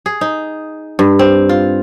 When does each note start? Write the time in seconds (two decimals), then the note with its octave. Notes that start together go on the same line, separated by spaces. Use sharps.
0.06 G#4
0.21 D#4
0.99 G2
1.19 C4
1.49 F4